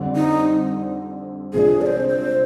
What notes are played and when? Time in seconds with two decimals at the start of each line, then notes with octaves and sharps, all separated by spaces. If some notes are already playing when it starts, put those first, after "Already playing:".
Already playing: F2 D3 G3 C4
0.16 D#4
1.53 C2 C3 F3 G#3 D4 G#4
1.81 D5
1.86 C5
2.08 C5